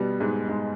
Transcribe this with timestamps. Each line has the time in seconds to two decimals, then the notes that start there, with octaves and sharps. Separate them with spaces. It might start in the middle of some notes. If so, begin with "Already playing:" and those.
Already playing: B2 G3 B3
0.20 G#2 G#3
0.49 G#2 G#3